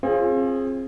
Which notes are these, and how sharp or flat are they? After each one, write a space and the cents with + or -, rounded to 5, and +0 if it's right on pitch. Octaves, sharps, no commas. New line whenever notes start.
C4 +35 F4 +0 G#4 +0